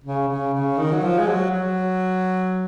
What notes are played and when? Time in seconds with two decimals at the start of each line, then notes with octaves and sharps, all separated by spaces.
0.04 C#3
0.28 C#3
0.53 C#3
0.77 D#3
0.92 F#3
1.03 F3
1.19 G#3
1.27 F#3
1.51 F#3